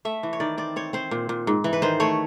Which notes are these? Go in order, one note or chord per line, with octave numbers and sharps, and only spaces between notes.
A3 E5
E3
C#5
D#3 D5
C4 D5
C4 C#5
C4 C5
A#2
A#2
G#2
E3
B4
D#3 C5
A3 C#5